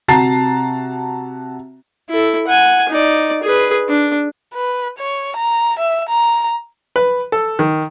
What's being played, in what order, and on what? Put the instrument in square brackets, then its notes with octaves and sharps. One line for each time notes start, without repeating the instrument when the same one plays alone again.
[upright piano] C3 F#4 A5 A#5 A6 C7
[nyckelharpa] E4 A4
F#5 G#5
D#4 D5
G#4 B4
D4
[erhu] B4
C#5
A#5
E5
A#5
[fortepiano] B4
A4
D#3